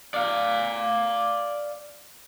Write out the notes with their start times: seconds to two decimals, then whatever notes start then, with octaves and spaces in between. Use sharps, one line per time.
0.14 D5 F5